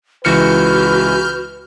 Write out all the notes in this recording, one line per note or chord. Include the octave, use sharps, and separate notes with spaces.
C#2 E3 F#4 B4 F6 G6 C#7